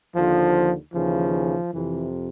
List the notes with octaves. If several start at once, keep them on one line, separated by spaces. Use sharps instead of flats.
D#2 D3 F3
D#2 C#3 E3 F3
F2 C3 E3